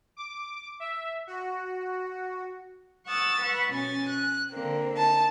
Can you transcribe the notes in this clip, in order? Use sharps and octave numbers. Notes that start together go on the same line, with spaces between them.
D6
E5
F#4
F#5 C#6 D#6 E6 A6
B4 F#5 C#6
B2 C#4 G#5 A6
F#6
D3 A#3 C4
D#4 A5